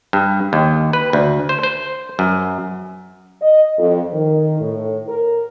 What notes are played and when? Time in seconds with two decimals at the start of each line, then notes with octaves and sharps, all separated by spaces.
0.13 G2
0.53 D#2
0.93 B4
1.13 D2
1.49 C5
1.63 C5
2.19 F#2
3.42 D#5
3.78 F2
4.12 D#3
4.60 A2
5.08 A#4